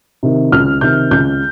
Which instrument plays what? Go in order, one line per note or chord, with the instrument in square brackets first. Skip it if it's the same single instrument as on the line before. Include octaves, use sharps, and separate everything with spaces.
[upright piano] C3 D#3
C#2 F6
C3 D#3 G6
C#2 G6